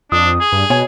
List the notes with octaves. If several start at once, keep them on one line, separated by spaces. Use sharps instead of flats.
F2 D4 D#6
G#4
G2
B2 C#5 G#5